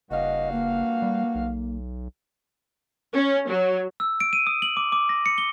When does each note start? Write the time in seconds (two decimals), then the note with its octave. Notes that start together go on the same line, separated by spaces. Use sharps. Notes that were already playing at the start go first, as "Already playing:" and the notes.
0.11 F#1 G2 F#4 D#5 F5
0.52 A#3
1.02 G3
1.35 B1
3.13 C#4
3.50 F#3
4.00 E6
4.20 D7
4.33 D#7
4.47 D#6
4.62 F#7
4.77 D6
4.92 D6
5.09 A#6
5.26 C#7
5.38 G7